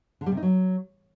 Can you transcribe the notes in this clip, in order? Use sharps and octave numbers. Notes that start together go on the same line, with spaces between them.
D3
G3
C3
D#4
F#3